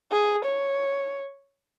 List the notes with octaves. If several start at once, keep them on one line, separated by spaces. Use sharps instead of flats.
G#4
C#5